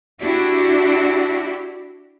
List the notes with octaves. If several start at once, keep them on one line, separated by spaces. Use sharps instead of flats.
D4 E4 F#4 G4